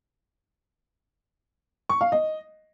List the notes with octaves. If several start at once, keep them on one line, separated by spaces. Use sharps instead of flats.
C#6
F5
D#5